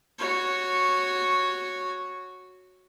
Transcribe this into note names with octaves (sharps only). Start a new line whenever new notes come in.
F#4 C#5